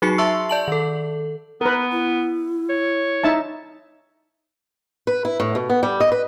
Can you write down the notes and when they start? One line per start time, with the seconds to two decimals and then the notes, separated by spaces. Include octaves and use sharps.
0.02 F#3 D#4 F#4 G#4 C7 C#7
0.18 E5 A5 C6 C#6 E6
0.49 D5 A5 F#7
0.68 D#3 A4
1.61 B3 A#4 B4
1.92 E4
2.69 C#5
3.24 D#4 E5 A5
5.07 B4
5.25 E4
5.40 A2
5.55 B2
5.70 B3
5.83 G3
6.00 D#5
6.12 B4